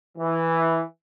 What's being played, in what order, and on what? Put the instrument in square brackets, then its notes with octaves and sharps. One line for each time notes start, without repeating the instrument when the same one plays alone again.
[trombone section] E3